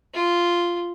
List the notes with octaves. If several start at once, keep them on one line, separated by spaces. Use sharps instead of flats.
F4